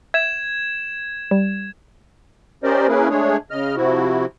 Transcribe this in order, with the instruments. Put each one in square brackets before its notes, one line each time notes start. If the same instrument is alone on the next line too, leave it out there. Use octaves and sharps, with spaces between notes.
[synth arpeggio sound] E5 [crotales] G#6 E7
[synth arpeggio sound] G3
[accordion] C#4 G4 A#4 C5 D5 D#5
A#3 C#4 E4 G#4 A#4 B4
G#3 A3 D4 G#4 C#5
C#3 D#5 F6
C3 F3 E4 F#4